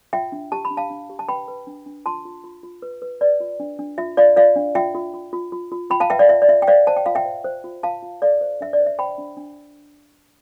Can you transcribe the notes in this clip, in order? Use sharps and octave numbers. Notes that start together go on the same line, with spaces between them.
F4 E5 G5
D4
G4 A5
B5
D4
F5 A5
D4
G4
A5
B4 G5 B5
B4
D4
D4
F4 A5 C6
F4
F4
F4
B4
B4
B4 D5
F4
D4
D4
F4 E5
F4 D5 F5
F4 D5 F5
D4
F4 E5 G5
F4
F4
F4
F4
F4
F4 G5 B5
F5 A5
B4 E5 G5
D5 F5
F4 E5
D5
F4 E5
G5
C5 D5 F5
C5 A5
G5
F4 F5
E5 G5
C5
C5
F4
F4 F5 A5
F4
A4 D5 F5
C5
D4 E5
D5
C5
E5
C5 G5 B5
D4
D4